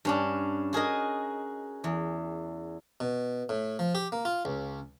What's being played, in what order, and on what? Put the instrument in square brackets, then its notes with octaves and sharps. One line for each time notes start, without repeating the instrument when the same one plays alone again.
[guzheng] G2 C#4 D4
F#4 G#4 A#4 D#5
E2
[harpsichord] B2
A2
F3
G4
A#3
F4
C#2